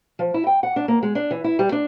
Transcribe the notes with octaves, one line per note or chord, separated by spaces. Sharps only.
F3
E4
G5
F#5
D4
A#3
G#3
D4
E3
E4
G3
D4